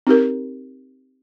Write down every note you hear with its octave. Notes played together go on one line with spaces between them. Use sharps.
C4 D#4 G4 A#4